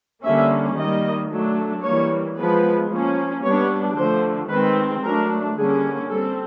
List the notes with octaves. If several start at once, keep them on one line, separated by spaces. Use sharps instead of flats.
D3 G3 A#3 C#4 E5
D#3 G3 A#3 D#5
F#3 A3 D4
E3 G3 A#3 C#5
F3 G#3 B3 B4
F3 A#3 C#4
G3 B3 D4 C#5
D3 F3 A3 C5
D#3 G#3 C4 B4
F#3 A3 D4 A#4
D3 G3 A#3 C#4 G#4
G3 C4 A4